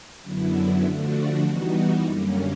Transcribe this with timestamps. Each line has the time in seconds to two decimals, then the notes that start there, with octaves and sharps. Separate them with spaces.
0.22 F#2 D3 F#3 B3 E4
0.82 D3 F3 A3 D4 F#4
1.43 E3 G3 B3 D#4 F#4
2.04 F#2 D3 G3 A#3 C#4